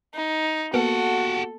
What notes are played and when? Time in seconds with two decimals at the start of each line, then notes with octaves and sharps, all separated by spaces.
0.15 D#4
0.74 A#3 B3 F#4 G4 A4 F#5